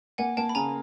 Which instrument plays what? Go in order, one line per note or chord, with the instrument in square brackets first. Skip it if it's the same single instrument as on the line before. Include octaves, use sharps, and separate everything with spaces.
[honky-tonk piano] A#3 [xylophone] F#5 G#5
[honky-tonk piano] A#3 [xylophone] G5 A5
[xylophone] B5
[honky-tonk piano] C#3 [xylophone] G#5 A#5